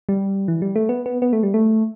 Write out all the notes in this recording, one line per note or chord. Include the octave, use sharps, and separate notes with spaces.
G3
E3
G3
A3
B3
B3
B3
A3
G3
A3